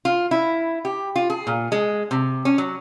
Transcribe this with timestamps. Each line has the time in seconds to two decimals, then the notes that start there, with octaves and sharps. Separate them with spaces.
0.05 F4
0.31 E4
0.85 G4
1.16 F4
1.30 G#4
1.47 A#2
1.72 G#3
2.11 C3
2.45 C#4
2.58 F#3